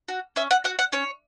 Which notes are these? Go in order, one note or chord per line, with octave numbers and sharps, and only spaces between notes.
F#4
C#4 E5
F#5
F#4 F#5
F#5
C#4 C#5